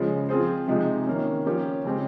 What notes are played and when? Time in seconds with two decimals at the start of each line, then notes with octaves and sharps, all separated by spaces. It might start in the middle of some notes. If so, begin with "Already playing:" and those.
Already playing: C#3 F3 G#3
0.29 F3 C4 F4 G#4 C5
0.68 C3 F3 G#3 D#4
1.06 D#3 A#3 C#4
1.46 F3 A#3 C#4 G4 C#5
1.85 C#3 G#3 C4 G4